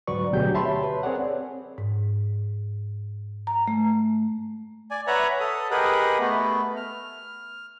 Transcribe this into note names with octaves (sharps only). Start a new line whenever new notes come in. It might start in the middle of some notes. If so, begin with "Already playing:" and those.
D2 G#2 F#3 B4 D5 C#6
D2 B2 F#3 G4 G#4 G6
G4 C#5 E5 A5 B5 C6
B4
C4 G#4 A#4 C#5 D5 F#5
G#2
A#5
A3
D5 G#5
B4 C#5 E5 F#5 A#5
A4 D#6
G4 G#4 A#4 B4 D#5 F#5
A3 B3
F6